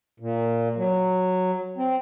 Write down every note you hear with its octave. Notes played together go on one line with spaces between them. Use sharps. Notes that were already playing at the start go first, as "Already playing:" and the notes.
A#2
F#3
C4